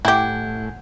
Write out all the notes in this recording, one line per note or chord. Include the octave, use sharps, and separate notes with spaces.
A2 E4 G4 F#5 G#5 G6